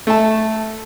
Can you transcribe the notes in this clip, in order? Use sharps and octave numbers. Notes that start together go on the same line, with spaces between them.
A3 A5